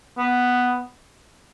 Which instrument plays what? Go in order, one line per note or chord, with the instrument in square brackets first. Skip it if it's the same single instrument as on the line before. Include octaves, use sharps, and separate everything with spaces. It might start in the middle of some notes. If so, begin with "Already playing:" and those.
[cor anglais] B3